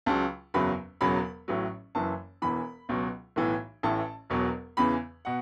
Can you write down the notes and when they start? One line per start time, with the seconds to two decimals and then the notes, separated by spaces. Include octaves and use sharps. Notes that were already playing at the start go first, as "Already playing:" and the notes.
0.06 C#2 C#3 F#3 A5
0.54 F#1 E2 C#3 F#3 B5
1.01 E1 E2 C#3 F#3 B5
1.48 A1 A2 F#3
1.95 F#1 F#2 E3 A5
2.42 E1 E2 E3 B5
2.89 C#2 B2 F#3
3.36 B1 A2 E3
3.83 A1 A2 E3 A5
4.30 E1 E2 B2 F#3
4.77 E2 C#3 E3 B5
5.25 B2 F#5